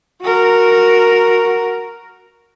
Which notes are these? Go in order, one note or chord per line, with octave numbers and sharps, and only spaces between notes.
F#4 A#4